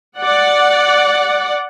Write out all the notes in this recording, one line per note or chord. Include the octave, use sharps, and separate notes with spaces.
D5 F#5